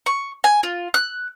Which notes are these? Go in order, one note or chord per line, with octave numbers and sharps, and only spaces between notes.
C#6
G#5
F4
F#6